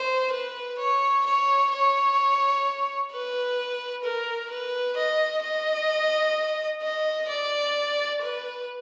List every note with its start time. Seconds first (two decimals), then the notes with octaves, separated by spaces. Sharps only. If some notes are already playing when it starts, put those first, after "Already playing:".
Already playing: C5
0.32 B4
0.79 C#5
1.26 C#5
1.72 C#5
3.11 B4
4.04 A#4
4.51 B4
4.97 D#5
5.42 D#5
6.82 D#5
7.29 D5
8.22 B4